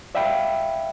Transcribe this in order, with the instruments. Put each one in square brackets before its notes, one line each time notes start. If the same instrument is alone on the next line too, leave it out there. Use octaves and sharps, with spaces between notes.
[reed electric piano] D5 E5 F5 G5 B5